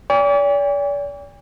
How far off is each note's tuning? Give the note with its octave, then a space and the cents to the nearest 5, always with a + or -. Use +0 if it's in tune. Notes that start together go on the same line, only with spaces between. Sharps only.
D5 -45 G5 +45